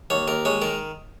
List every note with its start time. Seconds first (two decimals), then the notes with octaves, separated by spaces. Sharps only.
0.10 D#2 C#5
0.28 D#2 A#4
0.45 G#3 C#5
0.62 D#3 A#4